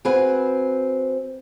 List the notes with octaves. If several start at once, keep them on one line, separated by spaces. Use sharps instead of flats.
C4 F#4 G#4 B4